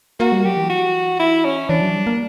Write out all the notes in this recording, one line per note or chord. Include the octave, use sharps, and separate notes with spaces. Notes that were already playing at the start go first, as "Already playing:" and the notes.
A#3 F#4
G3
F#3 G4
E3
F#4
E4
C#4
E3 D4
F#3
G3
A#3